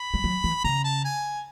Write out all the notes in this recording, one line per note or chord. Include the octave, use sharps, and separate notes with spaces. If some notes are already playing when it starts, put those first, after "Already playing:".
Already playing: B5
G3
F#3
E3
C#3 A#5
A5
G#5